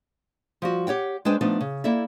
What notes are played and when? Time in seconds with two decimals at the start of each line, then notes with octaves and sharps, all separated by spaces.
0.62 F3 G3 F#4
0.87 G4 C#5 F#5 G5
1.25 G#3 D4 B4 C5 G5
1.41 F3 A3 B3 D4 D#4
1.61 C#3
1.84 A#3 E4 A4 D5 E5